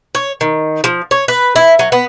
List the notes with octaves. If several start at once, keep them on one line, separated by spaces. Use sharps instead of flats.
C#5
D#3
F3
C#5
B4
E4
F#3
B3